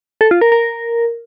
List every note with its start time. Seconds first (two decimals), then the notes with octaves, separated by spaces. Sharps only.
0.21 A4
0.31 F4
0.41 A#4
0.52 A#4